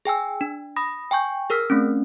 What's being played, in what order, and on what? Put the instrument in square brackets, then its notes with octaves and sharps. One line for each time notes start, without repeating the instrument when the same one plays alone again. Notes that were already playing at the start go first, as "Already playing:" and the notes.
[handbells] G#4 G5 G#5 E6
D4
B5 D#6 A#6
G5 G#5 C#6 G6
G#4 A#4 E6 F6 B6
A3 C4 C#4